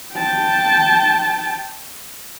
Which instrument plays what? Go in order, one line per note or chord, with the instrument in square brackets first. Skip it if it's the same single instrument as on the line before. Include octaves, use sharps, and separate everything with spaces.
[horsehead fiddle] G5 A5